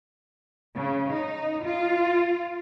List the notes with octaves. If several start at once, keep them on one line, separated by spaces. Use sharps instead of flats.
C#3
D#4
F4